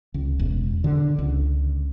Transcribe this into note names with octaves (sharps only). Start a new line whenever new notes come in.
C#2
E1
D3
C#2